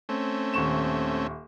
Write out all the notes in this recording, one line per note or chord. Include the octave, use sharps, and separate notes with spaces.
A3 C4 C#4
D#1 C#6 E7